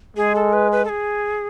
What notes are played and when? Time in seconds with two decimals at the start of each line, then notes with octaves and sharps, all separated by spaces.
0.17 G#3 G#4
0.35 A4
0.53 B4
0.72 B4
0.85 A4
0.89 G#4